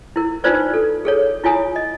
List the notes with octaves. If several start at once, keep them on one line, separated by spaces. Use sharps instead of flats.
E4 A#4
D4 D#4 F4 B4 C5 D5
A4
G#4 A4 C#5
E4 F4 C#5 G#5 D#6
D#5